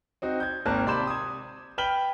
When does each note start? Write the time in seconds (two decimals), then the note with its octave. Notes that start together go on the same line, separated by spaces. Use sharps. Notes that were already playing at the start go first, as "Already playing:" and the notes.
0.22 C4 D#4 F#4
0.40 G6 G#6
0.66 G#1 A#3 C4 A#4 A5 F#6
0.86 C3 D5 B5 C6 G6 E7
1.07 D#6 G#6
1.78 B4 G5 F6 B6 F#7 G7